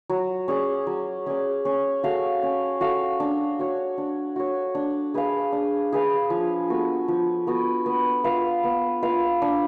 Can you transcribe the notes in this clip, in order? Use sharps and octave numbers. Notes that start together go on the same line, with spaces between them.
F#3
C#4 G#4 D5
F#3
C#4 G#4 D5
C#4
F#4 A4 F5
C#4
F#4 A4 F5
D4
F#4 C#5
D4
F#4 C#5
D4
G#4 B4 F5
D4
G#4 B4 F5
F3
B3 F#4 A4
F3
B3 F#4 A4
B3
F4 B4 F5
B3
F4 B4 F5
D4